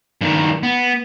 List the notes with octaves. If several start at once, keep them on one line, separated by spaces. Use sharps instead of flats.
G2 D#3
B3